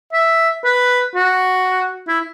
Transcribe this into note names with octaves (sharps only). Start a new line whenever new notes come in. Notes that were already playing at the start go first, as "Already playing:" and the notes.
E5
B4
F#4
E4